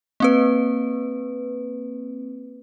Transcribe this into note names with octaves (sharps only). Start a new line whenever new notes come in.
A#3 C4 B4